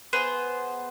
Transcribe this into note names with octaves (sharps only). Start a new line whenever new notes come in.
B3 G#4 C5